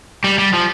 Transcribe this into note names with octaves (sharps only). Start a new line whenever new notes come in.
G3
G3
F3